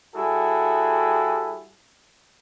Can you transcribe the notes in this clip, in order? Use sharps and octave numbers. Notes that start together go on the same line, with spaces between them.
G3 E4 F#4 G#4 A4